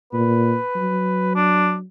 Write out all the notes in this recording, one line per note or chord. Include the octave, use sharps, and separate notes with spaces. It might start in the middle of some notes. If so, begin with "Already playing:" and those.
A#2 B4
F#3
D4